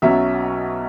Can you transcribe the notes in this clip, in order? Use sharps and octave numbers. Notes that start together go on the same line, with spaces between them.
B1 B2 F#3 C#4 E5